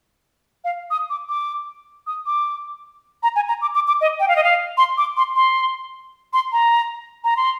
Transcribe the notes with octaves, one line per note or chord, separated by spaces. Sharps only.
F5
D#6
D6
D6
D#6
D6
A#5
G#5
A#5
D6
D6
D6
D#5
G5
F5
D#5
F5
C6
D6
C6
C6
C6
A#5
A#5
C6